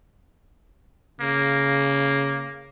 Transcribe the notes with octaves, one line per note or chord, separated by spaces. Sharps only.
C#3 A#3